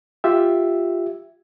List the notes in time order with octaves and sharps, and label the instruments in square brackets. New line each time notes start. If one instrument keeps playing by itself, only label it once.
[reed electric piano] F4 G4 E5